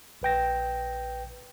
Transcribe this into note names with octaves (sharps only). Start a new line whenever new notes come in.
A#1 B4 G5 A#6